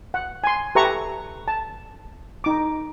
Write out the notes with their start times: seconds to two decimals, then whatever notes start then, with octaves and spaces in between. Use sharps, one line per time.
0.14 F#5
0.44 G#5 C6
0.75 G4 A4 B4 E5 A#5 C#6
1.48 A5
2.44 D#4 D6